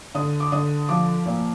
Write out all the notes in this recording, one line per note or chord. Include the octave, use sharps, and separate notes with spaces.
D3 D#6
D6
D3 D#6
F3 D6
A#2